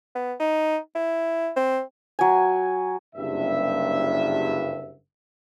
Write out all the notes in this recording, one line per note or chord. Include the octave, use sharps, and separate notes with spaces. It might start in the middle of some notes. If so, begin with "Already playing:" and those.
B3
D#4
E4
C4
F#3 G#5
F#1 G2 C3 E5